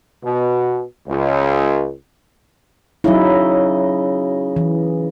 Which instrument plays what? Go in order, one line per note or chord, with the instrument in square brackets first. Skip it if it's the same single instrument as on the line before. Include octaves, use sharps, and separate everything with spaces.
[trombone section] B2
C#2
[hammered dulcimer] C#3 D#5 [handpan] F#3 D#4 E4
[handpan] E3